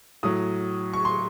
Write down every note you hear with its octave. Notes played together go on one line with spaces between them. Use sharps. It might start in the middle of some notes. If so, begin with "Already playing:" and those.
A2 F#3 D#6
C#6
C6